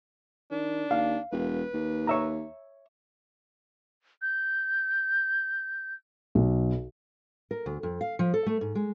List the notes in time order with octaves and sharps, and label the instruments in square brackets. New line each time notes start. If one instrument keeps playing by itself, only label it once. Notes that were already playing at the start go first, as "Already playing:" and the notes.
[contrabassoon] D#3 [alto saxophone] D4
[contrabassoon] D#2 [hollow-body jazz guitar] F5
[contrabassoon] E1 [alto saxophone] B4
[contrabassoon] D#2
[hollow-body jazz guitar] C#5 E5 A#5
[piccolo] G6
[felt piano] B1
[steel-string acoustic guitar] A#4
D2
F2
F5
F3
A4
A3
G#2
G#3